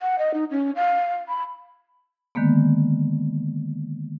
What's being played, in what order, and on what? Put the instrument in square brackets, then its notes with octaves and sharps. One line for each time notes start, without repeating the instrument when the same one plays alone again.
[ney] F#5
D#5
D#4
C#4
F5
B5
[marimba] D3 D#3 G#3 A#3 B3